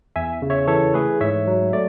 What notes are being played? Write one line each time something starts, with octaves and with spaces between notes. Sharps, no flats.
E2 E5 G#5
C#3
C#5 E5
E3 A4 C#5
A3 G#4 B4
G#2 C#5 E5
F#3
A3 D5